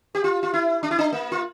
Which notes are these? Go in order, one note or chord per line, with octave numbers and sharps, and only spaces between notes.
G4
F4
F4
E4
D4
E4
D4
A#3
F4